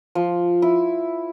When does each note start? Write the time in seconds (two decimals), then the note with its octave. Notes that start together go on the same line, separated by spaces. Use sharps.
0.15 F3
0.62 E4